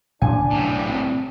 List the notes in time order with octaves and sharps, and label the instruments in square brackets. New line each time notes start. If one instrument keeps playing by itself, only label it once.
[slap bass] A2 D3 C#4 [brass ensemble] D4 [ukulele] G#5
[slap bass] B1 [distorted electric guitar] A2 G3
[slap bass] C4